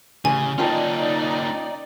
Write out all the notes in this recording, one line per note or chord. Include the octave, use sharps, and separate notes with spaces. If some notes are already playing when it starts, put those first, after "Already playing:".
A1 C#3 G#5
A#3 C#4 D#4 F4 D5 G5 A5